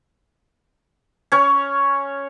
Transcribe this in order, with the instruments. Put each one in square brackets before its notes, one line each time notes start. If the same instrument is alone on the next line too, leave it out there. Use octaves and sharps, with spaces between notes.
[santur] C#4 C#5